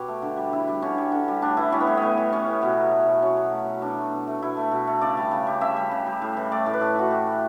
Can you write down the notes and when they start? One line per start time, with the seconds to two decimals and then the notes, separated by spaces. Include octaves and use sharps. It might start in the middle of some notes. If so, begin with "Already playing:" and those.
Already playing: B2 G4 B4 C#5
0.08 A3
0.22 D3
0.37 G3
0.52 D3 E4
0.68 G3
0.82 D3 C#4
0.98 G3
1.12 D3
1.28 G3
1.42 A2 D4
1.57 E3 E4
1.72 G3 C#4
1.81 B3
1.87 A2
1.97 A2 B3
2.18 E3
2.32 G3 C#4
2.47 A2
2.62 B2 B3
2.77 F#3
2.92 A3
3.06 B2
3.22 B2 C#4
3.37 F#3
3.53 A3
3.67 B2
3.82 B2 D4
3.97 A3
4.12 B2
4.27 A3
4.42 B2 E4
4.57 A3
4.72 B2
4.87 A3
5.01 C#3 D5
5.17 G3
5.31 C#3
5.47 G3
5.61 C#3 E5
5.76 G3
5.91 C#3
6.06 G3
6.22 A2
6.37 E3
6.52 A3 D5
6.66 A2
6.73 B4
6.81 A2 A4
6.96 E3 F#4
7.11 A3 G4
7.27 A2